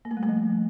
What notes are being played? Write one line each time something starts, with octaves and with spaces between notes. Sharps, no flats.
A#3
A3
G3
A3
F3